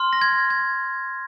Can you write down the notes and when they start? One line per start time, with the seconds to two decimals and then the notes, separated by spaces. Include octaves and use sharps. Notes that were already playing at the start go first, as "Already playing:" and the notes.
Already playing: C6 F6
0.13 A#6
0.22 G#6
0.50 G#6